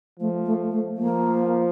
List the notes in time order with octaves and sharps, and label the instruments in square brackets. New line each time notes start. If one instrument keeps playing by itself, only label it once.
[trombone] F3 [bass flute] A3
[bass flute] A3
A3
[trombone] F3 [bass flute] A#3